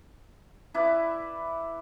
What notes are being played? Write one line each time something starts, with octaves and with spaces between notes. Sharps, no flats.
E4 B4 D5